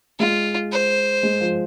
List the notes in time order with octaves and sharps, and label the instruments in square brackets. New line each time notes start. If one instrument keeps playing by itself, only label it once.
[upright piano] G#3 [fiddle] F4
[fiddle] C5
[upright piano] G#3
F3